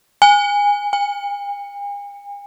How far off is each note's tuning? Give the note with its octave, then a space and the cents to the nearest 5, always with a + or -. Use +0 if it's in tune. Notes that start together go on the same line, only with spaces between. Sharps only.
G#5 -20
G#5 -45